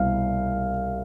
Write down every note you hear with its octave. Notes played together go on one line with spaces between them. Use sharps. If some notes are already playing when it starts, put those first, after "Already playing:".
Already playing: C2 B2 F5